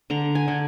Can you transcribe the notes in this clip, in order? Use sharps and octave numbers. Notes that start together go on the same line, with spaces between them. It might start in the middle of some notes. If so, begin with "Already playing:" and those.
D3 A#5
G#5
D3